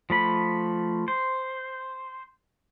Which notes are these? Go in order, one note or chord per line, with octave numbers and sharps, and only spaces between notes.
F3 A3 B5
C5